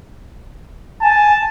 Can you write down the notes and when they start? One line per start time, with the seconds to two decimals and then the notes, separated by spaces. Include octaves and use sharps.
1.02 G#5 A5